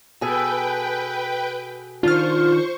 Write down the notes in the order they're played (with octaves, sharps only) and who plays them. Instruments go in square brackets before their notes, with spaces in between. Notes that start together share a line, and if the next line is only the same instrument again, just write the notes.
[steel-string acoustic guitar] B2 G#4 A4 [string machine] B4 G5
[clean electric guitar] D#3 D4 [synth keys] F4 F6 [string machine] C5 C#6